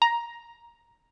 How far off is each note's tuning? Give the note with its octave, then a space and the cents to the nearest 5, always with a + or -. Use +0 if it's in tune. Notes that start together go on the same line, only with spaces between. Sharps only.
A#5 +10